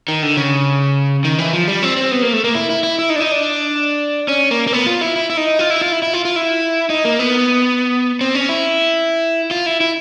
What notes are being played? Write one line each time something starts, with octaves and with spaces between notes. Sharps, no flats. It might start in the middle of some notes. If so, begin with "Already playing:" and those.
D#3
D3
C#3
D#3
E3
F3
G3
C4
C4
B3
A#3
A3
A#3
E4
E4
E4
E4
D#4
D4
D#4
D4
C#4
A#3
A#3
B3
F4
E4
E4
E4
D#4
F4
E4
F4
E4
E4
F4
F4
E4
D#4
A#3
B3
C4
C#4
E4
F4
E4
E4